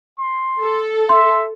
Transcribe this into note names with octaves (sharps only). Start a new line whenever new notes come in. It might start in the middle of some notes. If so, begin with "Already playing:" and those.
C6
A4
E5 C6